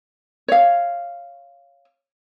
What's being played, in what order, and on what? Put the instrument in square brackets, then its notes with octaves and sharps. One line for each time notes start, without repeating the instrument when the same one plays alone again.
[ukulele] C#5 F5